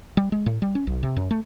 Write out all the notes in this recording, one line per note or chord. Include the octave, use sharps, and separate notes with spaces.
G3
G#3
A2
G3
C#4
B1
C3
F#2
A3